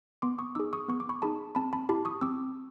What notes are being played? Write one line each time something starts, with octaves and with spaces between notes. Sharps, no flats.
B3 C6 D6
C#6 D#6
D#4 G#4 D6 E6
C#6 D#6
B3 C#6
D6
B5 C#6
D#4 G#4 A5 B5
C4 A5 B5
A5 B5
E4 G4 A5 B5
C#6 D#6
C4 D6 E6